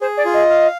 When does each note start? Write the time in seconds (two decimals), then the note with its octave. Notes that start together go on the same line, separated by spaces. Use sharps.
0.01 G#4 C5
0.17 D5
0.25 F4
0.33 D#5
0.50 F5